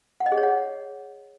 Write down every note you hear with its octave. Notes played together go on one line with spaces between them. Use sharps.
F#5
D#5
G#4
C#5
F#5